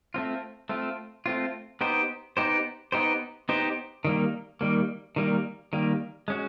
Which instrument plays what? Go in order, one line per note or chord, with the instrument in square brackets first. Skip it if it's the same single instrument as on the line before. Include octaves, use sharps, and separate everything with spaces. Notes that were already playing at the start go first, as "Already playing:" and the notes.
[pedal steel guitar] A3 C4 F4
A3 C4 F4
A3 C4 F4
B3 D#4 G4 C5
B3 D#4 G4 C5
B3 D#4 G4 C5
B3 D#4 G4 C5
D#3 G3 A#3
D#3 G3 A#3
D#3 G3 A#3
D#3 G3 A#3
G#3 C#4 F#4